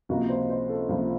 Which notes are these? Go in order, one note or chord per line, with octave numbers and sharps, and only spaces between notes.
C#2 C3 F3 A#3 F#4
C5
C5
A4
C#2 C3 F3 A#3 C5